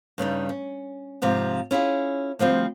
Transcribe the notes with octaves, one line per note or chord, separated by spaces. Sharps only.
G2 C#3 G3 D#4
C#4
F2 G#2 C3 F3
C#4 E4 F4 G#4
D2 F3 G3 C4